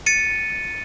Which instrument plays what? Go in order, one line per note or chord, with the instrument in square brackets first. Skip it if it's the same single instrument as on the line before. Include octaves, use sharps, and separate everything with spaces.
[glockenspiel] A6 C#7 D#7